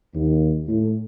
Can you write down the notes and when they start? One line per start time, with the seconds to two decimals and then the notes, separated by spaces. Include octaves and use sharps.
0.15 D#2
0.68 A2